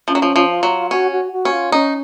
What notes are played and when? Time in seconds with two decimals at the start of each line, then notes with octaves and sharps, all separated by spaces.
0.08 F3 C#4
0.15 F#3
0.22 F3
0.36 F3
0.50 F4
0.63 F#3
0.91 C#4 F#4
1.11 F#4
1.32 F#4
1.45 C#4
1.52 F4
1.72 C#4 D#4